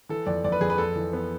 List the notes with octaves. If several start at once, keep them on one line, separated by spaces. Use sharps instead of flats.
E3 A4
F2 D5
F2 D5
B4
F2 G#4
B4
F2 A4
E3
B3